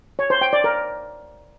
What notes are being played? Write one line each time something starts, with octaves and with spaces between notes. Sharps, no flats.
C#5
C5
G5
D5
A#4